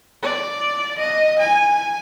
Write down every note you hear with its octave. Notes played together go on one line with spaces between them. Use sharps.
D5
D#5
G#5